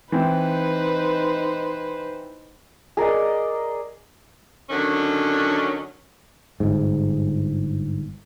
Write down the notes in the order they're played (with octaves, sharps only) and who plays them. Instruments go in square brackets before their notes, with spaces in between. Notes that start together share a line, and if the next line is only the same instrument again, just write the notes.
[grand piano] E3 C4 [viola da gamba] D#4 B4 C5
[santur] G#4 A#4 D5 D#5
[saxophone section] D3 D#3 F#3 C#4
[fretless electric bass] G1 G#2